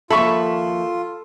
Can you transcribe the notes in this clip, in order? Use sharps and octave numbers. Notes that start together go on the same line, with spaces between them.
D#2 F3 F4 A4 E5 B5 C#6